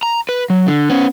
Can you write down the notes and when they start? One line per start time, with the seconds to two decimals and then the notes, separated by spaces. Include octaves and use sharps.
0.03 A#5
0.29 B4
0.50 F#3
0.68 D3
0.90 B3 C#4